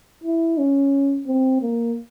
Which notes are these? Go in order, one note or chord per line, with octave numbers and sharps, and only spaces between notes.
E4
C#4
C4
A#3